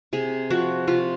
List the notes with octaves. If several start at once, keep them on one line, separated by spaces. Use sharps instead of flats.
C3 G#4
F3 F#4
C3 F4